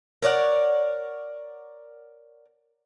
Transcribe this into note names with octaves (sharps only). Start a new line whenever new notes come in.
A#4 C#5 D5 F#5